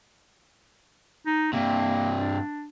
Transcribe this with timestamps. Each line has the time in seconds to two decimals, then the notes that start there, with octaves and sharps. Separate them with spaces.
1.26 D#4
1.53 G2 C3 A#3
2.19 D4